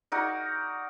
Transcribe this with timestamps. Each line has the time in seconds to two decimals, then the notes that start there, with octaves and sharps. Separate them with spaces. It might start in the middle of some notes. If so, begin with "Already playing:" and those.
0.12 D#4 F#4 A#4 D5